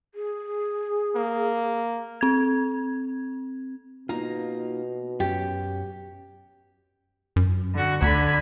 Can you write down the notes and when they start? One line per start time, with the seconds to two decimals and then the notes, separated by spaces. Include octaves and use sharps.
0.15 G#4
1.16 A#3
2.21 C4 G#6
4.09 B2 A#3 D#4 F4 A#5
5.20 F#2 C#4 G4
7.36 F#2
7.73 D3 F#4
8.02 D2 D3 B5 G#6